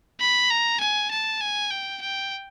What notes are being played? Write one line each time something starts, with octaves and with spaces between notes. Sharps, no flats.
B5
A#5
G#5
A5
G#5
G5
G5